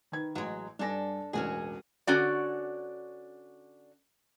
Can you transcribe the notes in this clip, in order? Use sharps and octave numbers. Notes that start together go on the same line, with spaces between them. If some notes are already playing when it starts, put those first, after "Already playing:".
D#3 B4 G#6
A1 F#3 G#3
G2 D4 A4 G#5 A#6
E1 A1 C#4 F#4 G#4
D3 C#4 F#4 D5